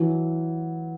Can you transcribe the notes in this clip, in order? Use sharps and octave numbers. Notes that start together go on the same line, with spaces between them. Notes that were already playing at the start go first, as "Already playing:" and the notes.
Already playing: E3 F#3